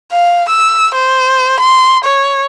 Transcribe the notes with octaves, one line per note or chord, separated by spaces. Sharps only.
F5
E6
C5
C6
C#5